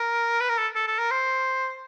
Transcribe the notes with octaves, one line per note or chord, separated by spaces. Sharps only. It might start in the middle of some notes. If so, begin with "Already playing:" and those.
Already playing: A#4
B4
A#4
A4
A4
A4
A#4
C5